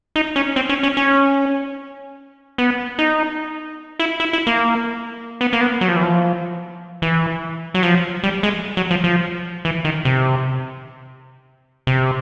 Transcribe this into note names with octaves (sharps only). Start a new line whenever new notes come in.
D#4
C#4
C4
C#4
C#4
C#4
B3
D#4
E4
E4
E4
A#3
B3
A#3
B3
F#3
F3
E3
F3
E3
F#3
F3
G3
G#3
F#3
F3
F3
E3
D#3
C3
C3